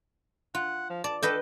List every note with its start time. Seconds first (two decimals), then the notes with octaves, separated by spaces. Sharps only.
0.55 F4 F#5
0.90 F3
1.04 D5 A5
1.22 A4 B4 D#5 G5